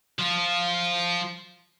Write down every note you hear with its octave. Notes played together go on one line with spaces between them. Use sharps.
F3 F4